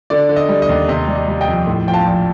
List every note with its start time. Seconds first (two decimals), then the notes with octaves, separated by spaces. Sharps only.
0.10 D3 D5
0.29 D3
0.36 D#5
0.49 G3
0.62 D#5
0.69 D#2
0.88 C3 D#5
1.08 G3
1.15 D#5
1.28 G3
1.41 D#5 G5
1.48 F2
1.67 A2
1.86 F3 G5
1.93 F5 A5
2.06 A#1